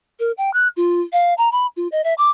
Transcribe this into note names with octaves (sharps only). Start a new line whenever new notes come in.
A#4
G5
F#6
F4
F5
A#5
B5
F4
D#5
E5
D6